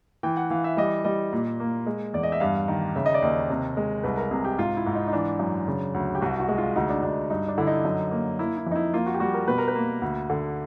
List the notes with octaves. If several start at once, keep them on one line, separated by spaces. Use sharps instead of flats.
E3 G5
F#5
E3 F5
E5
G3 D#5
G3 D#5
A#2
A#3
G#3
E2 D5
D#5
E5
G2 F5
D#3
C#3 E5
D#5
D5
D#2 D#5
C3
G#3
C2 B4
A#4
C3 G#4
G4
G#2 F4
E4
G#2
D#4
D#4
E3 D4
F#2
C#3
D2
G4
C2 F#4
F#4
G#3
F4
D2 D#4
D4
D2 D4
G2 D#4
D4
D3 E4
D#4
F#2
A#3
A#3 E4
E4
F2 D#4
E4
A#3 F4
F#4
G4
G3 F#4
A#4
B2 B4
A#4
B4
A#3
D2
D3